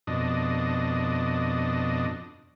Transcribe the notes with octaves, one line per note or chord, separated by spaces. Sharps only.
F2 B2 D4 D#5